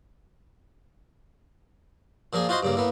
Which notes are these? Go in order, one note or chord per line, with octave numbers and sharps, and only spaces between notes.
A#2 F3 A#3 G#4
F4 F#4 C5 D#5 C6
G2 C#3 A#3
A2 A#3 B3